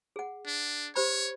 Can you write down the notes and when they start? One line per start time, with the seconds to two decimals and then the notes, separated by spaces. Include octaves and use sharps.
0.16 G#4 F#5
0.46 D4
0.96 G4 C5 C#5 B5